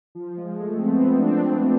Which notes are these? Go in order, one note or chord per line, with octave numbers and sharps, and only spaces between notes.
F3
G#3
A3
C4
B3
C4
D4
C4
C4